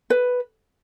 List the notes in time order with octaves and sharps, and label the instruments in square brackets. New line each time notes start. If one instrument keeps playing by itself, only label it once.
[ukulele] B4